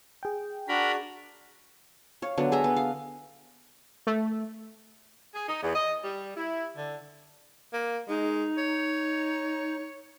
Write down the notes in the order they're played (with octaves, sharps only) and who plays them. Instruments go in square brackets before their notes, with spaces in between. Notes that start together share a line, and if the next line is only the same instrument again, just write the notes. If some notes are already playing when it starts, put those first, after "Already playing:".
[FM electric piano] G#4 G5
[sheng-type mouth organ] D4 F#4 [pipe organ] A#4 B5
[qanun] C#5 F5
D3 F#3 B3 D4
G#4 A4 E5 A#5
B3
F5
[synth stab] A3
[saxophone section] G#4
D#4
E2
D#5
G3
E4
D3
[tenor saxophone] A#3
[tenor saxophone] G#3 [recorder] D#4
[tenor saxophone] C#5